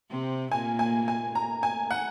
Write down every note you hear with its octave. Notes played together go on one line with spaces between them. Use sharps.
C3 C4
A#2 A#3 G#5
G#5
G#5
A#5
G#5
F#5